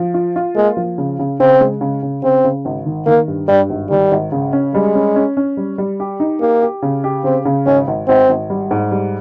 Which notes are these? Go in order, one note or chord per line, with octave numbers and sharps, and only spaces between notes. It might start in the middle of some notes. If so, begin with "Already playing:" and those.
Already playing: F3
F4
F4
G#3 A#3
F3
C#3
C#3
C#3 C4
G#3
C#3
C#3
C#3 C4
C#3
G#1
D#3
D#3 A#3
G2
G2 G3
G#1
D#3 G3
G#1
C#3
C#4
G3 G#3
C#4
C#4
C#4
G3
G3
G4
D#4
A#3 G4
G4
C#3
G4
C#3 C4
C#3
G#1 C#4
G#1
G#1 C4
G#1
G3
G#2
G3